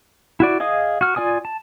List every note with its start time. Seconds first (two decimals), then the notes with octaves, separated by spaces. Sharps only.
0.40 E4 F#4 D5
0.60 G#4 D#5 F5 D#6
1.01 F#4 F6
1.16 F4 D5 G#5 D#6
1.45 A5